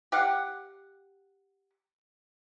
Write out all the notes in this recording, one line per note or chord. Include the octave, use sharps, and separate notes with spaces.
G4 F5 F#5